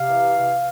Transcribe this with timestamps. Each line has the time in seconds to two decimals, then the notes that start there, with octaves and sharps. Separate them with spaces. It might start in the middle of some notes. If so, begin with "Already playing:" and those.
Already playing: C3 F5
0.09 E3